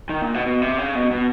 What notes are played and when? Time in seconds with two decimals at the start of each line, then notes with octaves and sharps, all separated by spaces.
0.09 D#3
0.22 A#2
0.34 B2
0.46 B2
0.62 C3
0.78 C#3
0.95 B2
1.11 B2